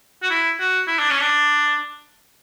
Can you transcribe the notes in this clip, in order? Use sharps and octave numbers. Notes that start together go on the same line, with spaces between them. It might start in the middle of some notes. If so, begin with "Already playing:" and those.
F#4
E4
F#4
E4
D4
C#4
D4